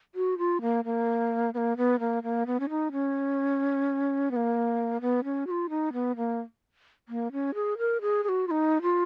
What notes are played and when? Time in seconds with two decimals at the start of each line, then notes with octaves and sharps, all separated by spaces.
0.15 F#4
0.38 F4
0.61 A#3
0.85 A#3
1.54 B3
1.57 A#3
1.77 B3
2.00 A#3
2.23 A#3
2.47 B3
2.60 C#4
2.69 D#4
2.92 C#4
4.31 B3
4.36 A#3
5.01 B3
5.24 C#4
5.47 F#4
5.51 F4
5.70 D#4
5.93 B3
6.16 A#3
7.09 A#3
7.32 C#4
7.55 G#4
7.78 A#4
8.01 G#4
8.24 G#4
8.29 F#4
8.48 F4
8.51 D#4
8.82 F4